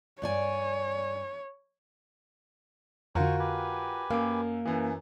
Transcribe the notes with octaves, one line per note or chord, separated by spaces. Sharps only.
G2 C#5 D5 G#5
F2 D3 F4 F#4 A#4 C5 G#5 C#6
G4 B4 G#5
F#2 A#3 F5 D6
F#2 E3